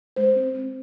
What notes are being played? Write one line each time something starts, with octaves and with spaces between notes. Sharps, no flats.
G#3 C5
C4
C4